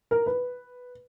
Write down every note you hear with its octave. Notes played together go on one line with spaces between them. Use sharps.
A#4
B4